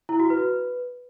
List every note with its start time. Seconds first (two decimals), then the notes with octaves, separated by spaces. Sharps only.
0.09 E4
0.20 F#4
0.30 B4